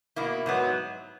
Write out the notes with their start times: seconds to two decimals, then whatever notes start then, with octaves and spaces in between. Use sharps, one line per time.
0.16 B2 A#3 E4
0.46 G#2 F#3 B3